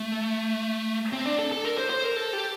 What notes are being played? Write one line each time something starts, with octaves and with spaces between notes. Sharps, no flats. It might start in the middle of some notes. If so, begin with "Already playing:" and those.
Already playing: A3
C4
D4
A4
A4
A#4
C5
C5
A#4
A4
G4